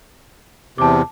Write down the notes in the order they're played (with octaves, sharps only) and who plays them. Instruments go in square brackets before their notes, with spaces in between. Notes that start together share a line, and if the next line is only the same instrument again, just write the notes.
[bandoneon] E2 C3 [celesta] A5 D6